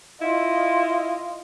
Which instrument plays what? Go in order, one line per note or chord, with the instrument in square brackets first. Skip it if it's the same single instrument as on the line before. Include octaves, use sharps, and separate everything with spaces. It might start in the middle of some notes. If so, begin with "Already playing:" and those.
[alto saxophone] E4 [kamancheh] F4 D#5